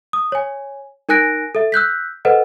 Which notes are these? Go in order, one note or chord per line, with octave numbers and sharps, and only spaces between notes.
D#6
C#5 G#5
D#4 A#4 G#5 F#6 A#6 D7
A4 E5
E6 F#6 G6 B6
A4 B4 C5 D#5 F#5